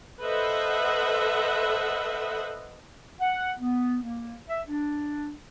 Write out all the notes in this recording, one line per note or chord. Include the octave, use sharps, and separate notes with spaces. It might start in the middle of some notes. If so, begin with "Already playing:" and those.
A4 B4 C5 D#5 E5 F#5
F#5
B3
A#3
E5
D4